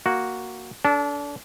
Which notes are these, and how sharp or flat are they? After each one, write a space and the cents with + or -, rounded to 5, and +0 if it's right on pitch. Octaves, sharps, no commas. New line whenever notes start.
A#3 +0 F#4 +0
D4 -30 A4 +0